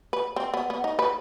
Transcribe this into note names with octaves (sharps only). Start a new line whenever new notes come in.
B4
C4
B3
B3
D#4
B4